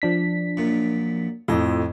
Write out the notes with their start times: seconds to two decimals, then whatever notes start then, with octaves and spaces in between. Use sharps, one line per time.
0.02 F3 D4 B6
0.57 F#2 A#2
1.48 F2 A2 F3 D#5